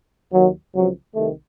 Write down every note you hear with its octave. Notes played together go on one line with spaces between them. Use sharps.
D#2 D#3 F#3
C#2 C3 F3 F#3
C2 C3 D#3 A3